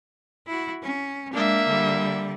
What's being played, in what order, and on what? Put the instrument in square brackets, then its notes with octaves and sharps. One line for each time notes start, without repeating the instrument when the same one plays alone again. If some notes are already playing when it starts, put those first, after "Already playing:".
[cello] E4 F#4
C#4
[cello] G#3 D4 [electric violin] A#3 E5
[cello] D3 G3